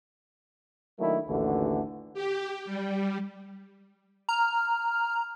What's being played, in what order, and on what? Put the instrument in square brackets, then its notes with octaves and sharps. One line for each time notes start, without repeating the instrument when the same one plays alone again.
[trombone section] D#3 F#3 A3 A#3 D4 E4
A1 D#2 D3 E3 A3 F#4
[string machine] G4
G3
[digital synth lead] A#5 [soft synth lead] F6